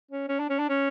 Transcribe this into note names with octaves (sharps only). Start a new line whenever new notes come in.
C#4
C#4
D4
C#4
D4
C#4